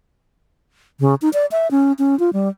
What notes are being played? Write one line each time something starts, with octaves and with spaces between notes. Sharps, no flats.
C#3
D#4
D5
E5
C#4
C#4
F4
G3